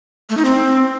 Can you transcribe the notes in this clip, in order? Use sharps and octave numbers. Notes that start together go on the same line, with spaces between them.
A3
D#4
C4